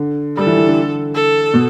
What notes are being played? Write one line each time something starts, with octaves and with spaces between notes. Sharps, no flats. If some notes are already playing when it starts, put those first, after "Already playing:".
Already playing: D3
G3 A4
E3
E3
D3
A4
B2